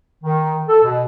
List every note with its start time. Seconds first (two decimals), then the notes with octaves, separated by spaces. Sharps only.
0.23 D#3
0.69 A4
0.84 B2